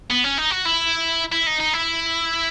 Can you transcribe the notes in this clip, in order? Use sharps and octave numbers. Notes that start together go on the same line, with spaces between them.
B3
C#4
D#4
F#4
E4
E4
D#4
D#4
E4